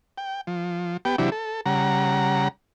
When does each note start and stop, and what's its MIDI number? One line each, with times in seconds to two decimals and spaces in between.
0.18 0.41 79
0.47 0.97 53
1.05 1.16 59
1.05 1.16 67
1.05 1.16 79
1.18 1.30 48
1.18 1.30 52
1.18 1.30 54
1.18 1.30 62
1.18 1.30 64
1.18 1.30 67
1.32 1.61 69
1.66 2.48 49
1.66 2.48 55
1.66 2.48 78
1.66 2.48 82